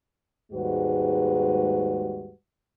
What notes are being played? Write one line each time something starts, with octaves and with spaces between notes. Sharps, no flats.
D#2 G#2 G3 G#3 F#4 B4